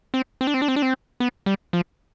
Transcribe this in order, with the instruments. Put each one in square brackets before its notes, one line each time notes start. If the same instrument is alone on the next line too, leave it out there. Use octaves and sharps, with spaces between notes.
[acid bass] C4
C4
D4
C4
D4
C4
D4
C4
B3
G3
F3